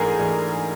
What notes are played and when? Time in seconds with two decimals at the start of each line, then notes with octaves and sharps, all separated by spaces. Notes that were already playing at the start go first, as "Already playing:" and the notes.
Already playing: G#2 E3 A3 D4 G#4 A#4
0.19 G#2 E3 A3 D4